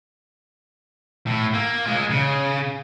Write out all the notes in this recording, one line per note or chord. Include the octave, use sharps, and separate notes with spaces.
A2
A#3
G#3 F4
C#3